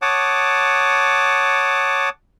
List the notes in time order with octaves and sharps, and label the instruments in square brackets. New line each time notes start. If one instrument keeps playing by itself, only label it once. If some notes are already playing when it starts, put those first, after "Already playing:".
[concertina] C#5 F#5 A5 D6 D#6